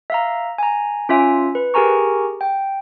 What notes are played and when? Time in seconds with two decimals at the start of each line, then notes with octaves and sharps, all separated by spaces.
0.10 E5 F5 A#5
0.58 G#5 A#5
1.09 C#4 F4 E5 G#5
1.55 B4
1.74 G4 G#4 A#4 G#5 A#5 C#6
2.41 G5